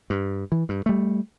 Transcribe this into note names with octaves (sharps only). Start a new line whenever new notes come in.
G2
E3
G2
G3 A3